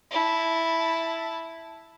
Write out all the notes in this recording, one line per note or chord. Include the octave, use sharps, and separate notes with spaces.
E4 A5